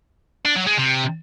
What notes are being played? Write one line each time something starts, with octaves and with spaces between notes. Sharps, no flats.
D4
F#3
G#3
C3